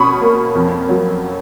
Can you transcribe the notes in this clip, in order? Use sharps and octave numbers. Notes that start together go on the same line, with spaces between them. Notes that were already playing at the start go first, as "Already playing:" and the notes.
Already playing: B2 C#4 B5 C#6 D#6
A#3
F2
F#3